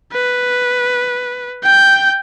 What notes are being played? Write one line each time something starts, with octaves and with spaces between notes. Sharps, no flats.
B4
G5 G6